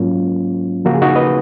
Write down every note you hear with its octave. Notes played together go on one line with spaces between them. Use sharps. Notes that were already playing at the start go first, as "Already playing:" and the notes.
Already playing: G#2 F#3 A#3 C#4 F4
C#3 F3 A#3 F#4
G#4
D#4 F#4
B4 D#5